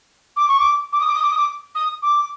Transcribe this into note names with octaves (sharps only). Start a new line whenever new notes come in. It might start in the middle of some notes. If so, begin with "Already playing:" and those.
D6
C#6
D6
D6
D#6
D6
D#6
D6
D#6
D6
D#6
D6